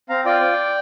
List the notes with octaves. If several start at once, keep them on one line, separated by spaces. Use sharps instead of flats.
C4 F5 A#5
F4 D5 G5